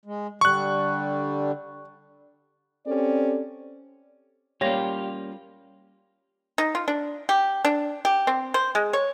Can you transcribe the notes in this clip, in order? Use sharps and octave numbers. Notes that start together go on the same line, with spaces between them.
G#3
D3 G3 C#6 F#6
C4 C#4 G4 A4 D5
G3 A#3 C#4 F4 G4 C#5 A#6
D#4
F4
D4
G4
D4
G4
C4
C5
G#3
C#5